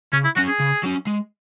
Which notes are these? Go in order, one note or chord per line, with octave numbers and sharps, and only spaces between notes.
C#3 C#4
E4
F#3 C#4 F#4
G#4
C#3
F#3 C#4
G#3